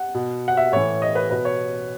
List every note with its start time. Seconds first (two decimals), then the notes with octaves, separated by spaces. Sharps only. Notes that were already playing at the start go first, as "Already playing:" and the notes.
Already playing: F#5
0.14 B2
0.48 F#5
0.57 E5
0.72 A2 E3 C#5
1.02 D#5
1.15 B4
1.30 B2 B4
1.45 C#5